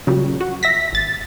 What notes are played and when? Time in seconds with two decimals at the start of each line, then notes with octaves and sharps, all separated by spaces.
0.07 A#2 C#3 F#3 G3
0.41 F#4
0.63 E5 A#6 B6
0.92 G#1 A6